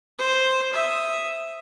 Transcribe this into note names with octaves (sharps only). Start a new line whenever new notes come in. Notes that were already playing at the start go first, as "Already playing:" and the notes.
C5
E5 D#6